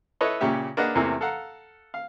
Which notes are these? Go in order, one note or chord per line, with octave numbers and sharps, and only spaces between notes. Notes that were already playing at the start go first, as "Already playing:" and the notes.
E4 A4 B4 C#5 D#5
A#2 C#3 C#4 G4 E5
A#3 D4 G#4 B4 D#5 F#5
E2 C3 E3 A3 A#3
A4 F5 F#5 A#5
F5